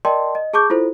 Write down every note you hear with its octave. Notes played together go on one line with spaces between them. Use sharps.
A#4 D5 D#5 G5 A5 C6
D#5
G#4 A5 C#6 D6 G6
E4 F4 A4 C5